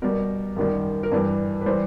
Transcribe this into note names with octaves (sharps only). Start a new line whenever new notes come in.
B2 G3 A#4
F#2 D#3 G3
A#4
G2 E3 G3 B4
B4
E3 G3 C5